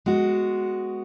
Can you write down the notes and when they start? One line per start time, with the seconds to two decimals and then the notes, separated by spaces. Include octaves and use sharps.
0.06 G#3 B3 F#4